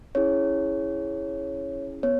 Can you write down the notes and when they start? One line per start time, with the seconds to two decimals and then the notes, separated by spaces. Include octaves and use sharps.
0.15 C#4 E4 G#4 C#5
2.03 B3 C#5